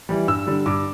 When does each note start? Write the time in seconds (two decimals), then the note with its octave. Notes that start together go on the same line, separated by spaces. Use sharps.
0.09 E3 G3
0.27 G2 E6
0.47 D3 G3
0.66 G2 D6